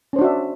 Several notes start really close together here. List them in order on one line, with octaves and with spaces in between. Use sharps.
C#4 C5 D4 F#4 E5